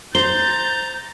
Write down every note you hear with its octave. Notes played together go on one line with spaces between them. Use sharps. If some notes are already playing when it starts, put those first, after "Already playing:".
C5 A#5 G6 A6 G7